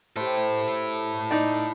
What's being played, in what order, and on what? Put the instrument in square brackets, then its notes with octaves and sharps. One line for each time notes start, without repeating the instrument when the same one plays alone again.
[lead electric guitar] E4 A4 [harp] G4 C5
[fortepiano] D#4 D5